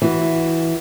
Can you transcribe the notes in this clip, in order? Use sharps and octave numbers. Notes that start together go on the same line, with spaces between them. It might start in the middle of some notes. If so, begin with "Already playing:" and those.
E3 F#4